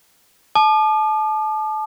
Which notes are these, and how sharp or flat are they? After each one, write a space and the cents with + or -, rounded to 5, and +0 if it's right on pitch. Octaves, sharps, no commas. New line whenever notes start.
A5 -30 D6 +45